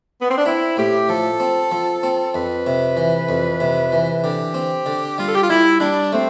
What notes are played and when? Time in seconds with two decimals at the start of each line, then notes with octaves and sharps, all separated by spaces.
0.20 B3
0.29 C4
0.38 D4
0.45 C4 E4
0.77 A2 G4
1.08 F3 A4
1.40 C4
1.72 F3
2.03 C4
2.34 F2 B4
2.67 C3
2.97 E3
3.29 F2
3.60 C3
3.92 E3
4.23 D3 G4
4.54 C4
4.86 D3
5.18 G3 F4
5.28 A4
5.35 G4
5.41 F4
5.49 G3 E4
5.80 G3 D4
6.12 A3 C4